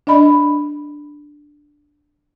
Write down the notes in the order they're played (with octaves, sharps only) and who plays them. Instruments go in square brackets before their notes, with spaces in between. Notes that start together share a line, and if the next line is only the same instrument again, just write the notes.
[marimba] D4 D5 D#5 B5